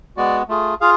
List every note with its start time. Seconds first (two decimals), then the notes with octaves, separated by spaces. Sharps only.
0.17 G#3 B3 F#4 D5
0.49 A3 F4 G#4
0.81 F4 G#4 F5